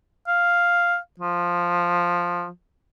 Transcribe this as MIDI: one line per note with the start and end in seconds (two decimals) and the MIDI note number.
0.28 0.96 77
1.20 2.48 53